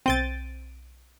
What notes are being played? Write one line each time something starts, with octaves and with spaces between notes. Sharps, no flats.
B1 C4 G6 A6 D7 D#7